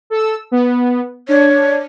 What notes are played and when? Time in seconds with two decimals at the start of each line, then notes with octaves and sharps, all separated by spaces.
0.10 A4 E6
0.52 B3
1.29 D4 C#5